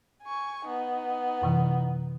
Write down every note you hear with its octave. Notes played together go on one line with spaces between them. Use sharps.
G#5 C#6
B3 D#4
F#2 C3 E3